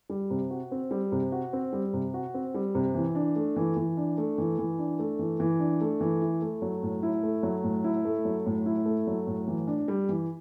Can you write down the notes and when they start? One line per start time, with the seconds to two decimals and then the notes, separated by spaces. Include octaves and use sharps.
0.10 G3
0.30 C3
0.51 F#4
0.71 C4
0.91 G3
1.12 C3
1.32 F#4
1.53 C4
1.73 G3
1.94 C3
2.14 F#4
2.34 C4
2.54 G3
2.75 C3
2.95 E3
3.15 D4
3.36 A3
3.56 E3
3.76 E3
3.97 D4
4.18 A3
4.38 E3
4.58 E3
4.79 D4
4.99 A3
5.19 E3
5.40 E3
5.59 D4
5.81 A3
6.01 E3
6.21 E4
6.42 A3
6.62 F#3
6.83 A2
7.03 E4
7.23 A3
7.43 F#3
7.64 A2
7.84 E4
8.05 A3
8.25 F#3
8.46 A2
8.66 E4
8.86 A3
9.07 F#3
9.27 A2
9.47 E3
9.67 D4
9.88 G3
10.09 E3